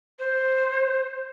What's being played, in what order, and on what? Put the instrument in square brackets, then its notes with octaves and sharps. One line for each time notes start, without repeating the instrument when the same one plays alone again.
[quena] C5